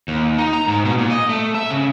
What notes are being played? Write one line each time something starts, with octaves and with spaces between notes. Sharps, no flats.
D#2
D#4
A#5
G#2
B2
A#2
D#5
A3
E5
C#3